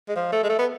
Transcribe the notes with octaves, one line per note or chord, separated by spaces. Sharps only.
G#3
F3
A3
G#3
A3
B3